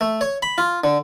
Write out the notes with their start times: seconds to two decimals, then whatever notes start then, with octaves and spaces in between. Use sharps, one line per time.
0.01 A3
0.21 C#5
0.43 B5
0.58 F4
0.84 D3